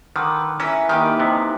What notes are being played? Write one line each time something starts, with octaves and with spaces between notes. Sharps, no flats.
D3 D#3 B4
E3 C#4 A#4 B4 E5
D#3 A#3 D#4 G4 B4
F2 C3 B3